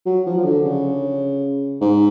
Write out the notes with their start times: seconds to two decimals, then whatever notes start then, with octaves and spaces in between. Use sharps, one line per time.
0.06 F#3
0.27 F3
0.38 F3
0.45 D3
0.65 C#3
1.81 G#2